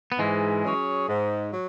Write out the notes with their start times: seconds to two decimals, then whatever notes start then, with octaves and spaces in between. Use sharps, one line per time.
0.12 B3
0.19 G#2 E3 G#3
0.64 F#3 C#4 G#4 C#5
1.09 G#2
1.53 F#3